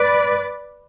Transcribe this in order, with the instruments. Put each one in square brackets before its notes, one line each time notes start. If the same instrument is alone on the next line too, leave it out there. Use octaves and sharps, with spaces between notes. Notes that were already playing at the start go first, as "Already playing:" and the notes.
Already playing: [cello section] B4 D5